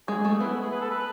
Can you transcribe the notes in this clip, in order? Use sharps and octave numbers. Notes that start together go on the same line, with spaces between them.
G#3 G#4
A3
B3 E4
G#4
B4
A4
B4